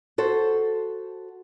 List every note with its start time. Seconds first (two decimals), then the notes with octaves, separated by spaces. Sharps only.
0.18 F#4 A4 C5